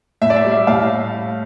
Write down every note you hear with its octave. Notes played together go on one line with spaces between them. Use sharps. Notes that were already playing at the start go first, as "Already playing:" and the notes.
A2 E5
D5
E5
G3
E5
A2 F5